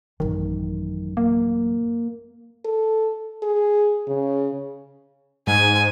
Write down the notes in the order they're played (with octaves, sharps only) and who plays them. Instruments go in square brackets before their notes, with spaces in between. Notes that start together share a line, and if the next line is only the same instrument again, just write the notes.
[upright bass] A1 F#2 [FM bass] D#3
[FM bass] A#3
[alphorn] A4
G#4
C#3
[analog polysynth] G#2 [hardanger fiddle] G#5